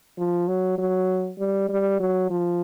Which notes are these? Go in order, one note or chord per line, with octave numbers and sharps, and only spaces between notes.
F3
F#3
F#3
G3
G3
F#3
F3